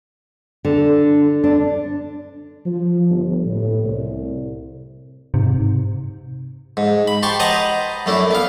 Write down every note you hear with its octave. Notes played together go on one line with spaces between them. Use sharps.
D3
D4
F3
G1
A2
C2
G#2 C3
G#2
B5
G4 A5 C6 C#6
B4 C5 D#5 F#5 A5 A#5
F#2 A3 D4 E4
B3 F5